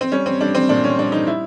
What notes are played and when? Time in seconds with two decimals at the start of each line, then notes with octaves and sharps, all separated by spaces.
0.01 C4
0.12 G3 C#4
0.26 C4
0.41 G3 D4
0.55 C4
0.69 A#2 D4
0.84 C#4
0.99 G3 D4
1.12 D#4
1.27 E4